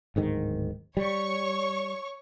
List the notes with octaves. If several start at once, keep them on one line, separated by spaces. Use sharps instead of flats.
D1 G#2 D#3
G3 C#5 C#6